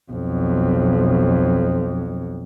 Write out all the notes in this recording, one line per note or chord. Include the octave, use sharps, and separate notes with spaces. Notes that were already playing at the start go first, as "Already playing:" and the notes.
B1 F2